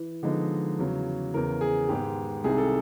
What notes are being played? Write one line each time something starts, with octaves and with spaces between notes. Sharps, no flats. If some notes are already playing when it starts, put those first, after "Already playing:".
Already playing: E3
D3 F3 G#3 B3 D#4
E2 C#3 F#3
E2 C#3 E3 A#4
G#4
G#2 D#3 G#3 B3 G4
C2 C3 D#3 G3 G#4
A4